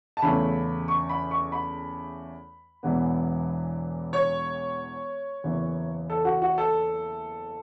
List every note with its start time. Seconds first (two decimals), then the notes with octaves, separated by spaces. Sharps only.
0.17 A5
0.22 E2 C#3 A3 C#4 B5
0.88 C#6
1.09 B5
1.31 C#6
1.52 B5
2.83 E1 E2 E3 B3
4.13 C#5
5.44 F#1 E2 E3
6.10 A4
6.25 F#4
6.42 F#4
6.58 A4